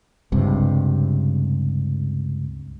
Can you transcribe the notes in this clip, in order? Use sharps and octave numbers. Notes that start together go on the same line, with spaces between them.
C#2 G2 C3